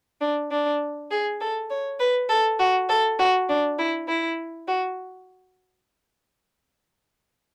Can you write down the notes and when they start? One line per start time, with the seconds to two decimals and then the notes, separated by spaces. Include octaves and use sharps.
0.21 D4
0.51 D4
1.11 G#4
1.41 A4
1.70 C#5
2.00 B4
2.29 A4
2.59 F#4
2.89 A4
3.19 F#4
3.49 D4
3.78 E4
4.08 E4
4.68 F#4